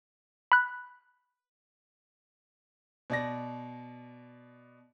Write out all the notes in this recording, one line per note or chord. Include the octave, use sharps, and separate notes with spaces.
B5 F#6
B2 D5 A#6